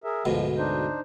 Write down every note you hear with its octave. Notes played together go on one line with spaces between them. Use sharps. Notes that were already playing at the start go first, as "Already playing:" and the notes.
G#4 A#4 E5
D2 G#2 B2 F3
D4 D#4 C5